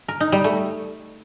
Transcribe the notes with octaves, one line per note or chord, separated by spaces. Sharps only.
A#4
D#4
G3
A3